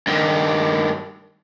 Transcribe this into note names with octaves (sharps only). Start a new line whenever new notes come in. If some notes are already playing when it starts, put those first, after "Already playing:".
G2 D#3